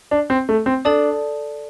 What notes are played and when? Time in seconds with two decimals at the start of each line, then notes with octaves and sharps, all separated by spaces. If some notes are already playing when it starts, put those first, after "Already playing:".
0.11 D4
0.30 C4
0.49 A3
0.66 C4
0.85 D4 A4 D5 A5 D#6